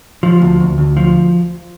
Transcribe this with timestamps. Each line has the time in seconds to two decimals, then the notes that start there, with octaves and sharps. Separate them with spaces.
0.23 F3
0.42 D2
0.60 D2
0.78 D2
0.97 F3